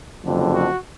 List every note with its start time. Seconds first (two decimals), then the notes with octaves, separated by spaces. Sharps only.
0.23 F#1 F2 D3
0.51 F#4